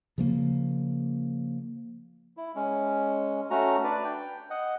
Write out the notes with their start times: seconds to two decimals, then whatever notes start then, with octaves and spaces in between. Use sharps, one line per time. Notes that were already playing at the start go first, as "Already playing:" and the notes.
0.18 C#3 F3 A#3
2.37 E4
2.55 G#3 C#4
3.50 A3 C#4 F#4 A#5
3.84 D4 B4 D5
4.04 G5
4.50 D#5 F#5